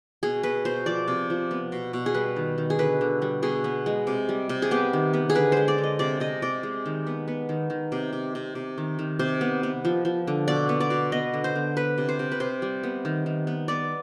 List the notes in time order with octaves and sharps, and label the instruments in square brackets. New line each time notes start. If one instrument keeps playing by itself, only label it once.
[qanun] B2 G#4
B2 B4
B2 C5
F3 D5
C3
F3
B3
B2
B2
G#4
G3 B4
D#3
D#3
G#4
D3 B4
D3
G3
B2 G#4
B3
G#3
C3
G3
C3
G#4
B3 G4
D#3
B3
G#4
D3 B4
G#3 C5
D5
D3
D#5
C3 D5
C3 D#5
C3 D5
G#3
D#3
B3
B3
D#3
D#3
C3
C3
C3
C3
D#3
D#3
C3 C5
B3
B3
F3
F3
D3
B2 D5
B3
D5
B2
B3 D#5
D3
C5
D3
B3 B4
C3
C5
C3
B4
C3 C5
G3
B3
D#3
D#3
B3
B3 D5